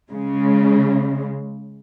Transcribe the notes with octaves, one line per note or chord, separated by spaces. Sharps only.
C#3 G#3